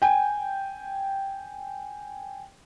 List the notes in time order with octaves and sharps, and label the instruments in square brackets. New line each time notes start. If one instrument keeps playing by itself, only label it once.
[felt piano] G5 G#5